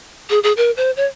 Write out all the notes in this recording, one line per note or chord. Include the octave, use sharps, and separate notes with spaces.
G#4
G#4
A#4
C5
C#5